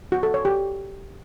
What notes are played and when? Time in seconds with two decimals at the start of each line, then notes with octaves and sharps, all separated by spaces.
0.12 F#4
0.23 A4
0.34 C#5
0.45 G4